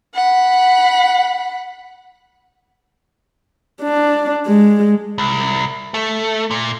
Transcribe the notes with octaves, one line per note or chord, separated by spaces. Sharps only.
F#5 B5
D4
G#3
C2
A3
A#2